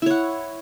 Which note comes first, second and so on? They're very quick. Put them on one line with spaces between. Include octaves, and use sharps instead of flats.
E4 C#5 F#5